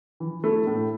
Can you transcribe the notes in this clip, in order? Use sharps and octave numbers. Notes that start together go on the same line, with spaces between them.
E3
A3 E4
A2